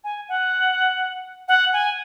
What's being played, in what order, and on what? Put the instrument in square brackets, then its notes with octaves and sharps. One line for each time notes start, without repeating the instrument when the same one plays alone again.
[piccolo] G#5
F#5
F#5
G#5